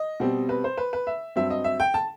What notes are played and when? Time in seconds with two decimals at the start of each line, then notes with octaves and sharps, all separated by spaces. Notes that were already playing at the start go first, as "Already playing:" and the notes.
Already playing: D#5
0.20 B2 G3 C4
0.49 B4
0.64 C5
0.77 B4
0.93 B4
1.07 E5
1.36 G2 F#3 C4 E5
1.50 D#5
1.64 E5
1.80 G5
1.94 A5